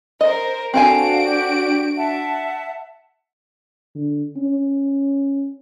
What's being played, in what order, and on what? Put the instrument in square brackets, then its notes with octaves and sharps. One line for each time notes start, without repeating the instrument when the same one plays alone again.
[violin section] A#4 C5 [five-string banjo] D#5
[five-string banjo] C4 A4 G#5 [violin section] D4 F#4 D7 [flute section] F5 A5
[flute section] G4
E5 F#5 A5
[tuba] D3
C#4